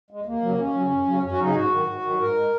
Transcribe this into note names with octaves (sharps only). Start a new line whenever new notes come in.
G#3
D#2 A#3
C#3 F#3
D#2 C#4
F#3
C#3
F#2
C#3 F#3
F#2 C#4
F#4
C#3 F#3 D#4
G#4
G#2 F#4
D#3 F#3
G#2
D#3 F#3
G#2 A#4
G#3